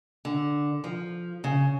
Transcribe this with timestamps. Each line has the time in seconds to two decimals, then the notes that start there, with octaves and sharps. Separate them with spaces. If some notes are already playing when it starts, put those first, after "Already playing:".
0.25 D3
0.84 F3
1.44 C#3